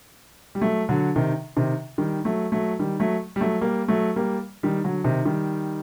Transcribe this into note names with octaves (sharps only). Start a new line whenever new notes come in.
G3
F#3 A3
D3 F#3
C3 D#3
C3 D#3
D#3 G3
F#3 A3
F#3 A3
D#3 G3
F#3 A3
G3
F#3 A3
G3 A#3
F#3 A3
G3 A#3
D#3 G3
D3 F#3
C3 D#3
D#3 G3